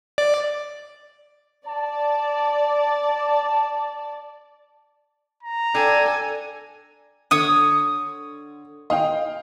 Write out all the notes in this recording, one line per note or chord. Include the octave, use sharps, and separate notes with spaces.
D5
D5 A5
A#5
D4 A4 G5 G#5
D3 C#5 D#6
D#5 F5 G5